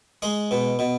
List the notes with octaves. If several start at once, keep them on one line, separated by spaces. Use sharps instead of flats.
G#3 G#4
B2
B2